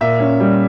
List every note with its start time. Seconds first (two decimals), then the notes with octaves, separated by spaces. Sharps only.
0.01 A#2 E5
0.20 C#4
0.40 G3